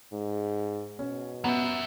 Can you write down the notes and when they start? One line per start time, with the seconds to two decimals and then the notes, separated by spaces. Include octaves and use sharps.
0.13 G#2
0.99 B2 C#4
1.44 F#3 B3 E5